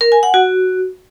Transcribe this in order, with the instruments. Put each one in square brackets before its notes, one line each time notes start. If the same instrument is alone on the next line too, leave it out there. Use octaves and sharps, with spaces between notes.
[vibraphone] A#4
G#5
F#5
F#4